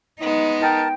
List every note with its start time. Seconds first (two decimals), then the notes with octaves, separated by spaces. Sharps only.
0.21 G#3 B3 D#4
0.62 A#4 G5 A5